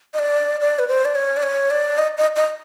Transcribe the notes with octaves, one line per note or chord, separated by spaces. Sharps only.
D#5
D5
D5
B4
C5
D5
C#5
D5
C#5
D5
D#5
D#5
D#5